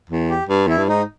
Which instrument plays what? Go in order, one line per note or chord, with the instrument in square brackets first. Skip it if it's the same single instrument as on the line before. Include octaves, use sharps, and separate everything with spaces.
[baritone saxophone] E2
[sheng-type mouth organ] G4
[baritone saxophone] G2
[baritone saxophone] E2 [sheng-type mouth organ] E4
[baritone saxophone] G2
[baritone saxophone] G#2 [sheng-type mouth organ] D#4